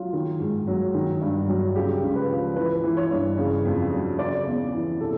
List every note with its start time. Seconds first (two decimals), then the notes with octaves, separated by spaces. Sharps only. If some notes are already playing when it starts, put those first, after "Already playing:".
Already playing: F#3 F4
0.13 D#3
0.40 G#2
0.67 F#3
0.94 D#3
1.21 G2
1.48 F#3
1.76 C#3 G4
2.02 C#2
2.16 B4
2.30 F3
2.56 E3 B4
2.83 E3
2.97 C#5
3.11 G2
3.38 C#3
3.65 F2
3.92 F#3
4.18 C#3 D5
4.46 E2
4.73 E3
5.00 C3 A4